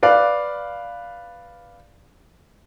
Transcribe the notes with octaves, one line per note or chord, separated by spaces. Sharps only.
B4 D5 F5